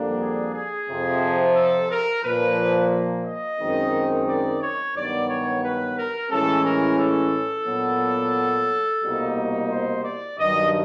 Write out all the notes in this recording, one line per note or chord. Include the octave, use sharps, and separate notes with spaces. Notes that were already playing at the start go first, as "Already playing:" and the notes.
Already playing: F2 D3 G3 A#3 D4
G#4
G#4
F2 C3 F3
A4
A#4
A#2 F3 A#3 B4
D#5
F#2 D#3 G#3 C4 D#4
D5
C#5
G2 D#3 F#3 B3 D5
C#5
B4
A#4
A2 E3 G#3 C#4 A4
A#4
A4
A#2 F#3 B3 D4
C2 B2 G3 A#3 D#4
C5
D5
G2 D#3 F#3 D#5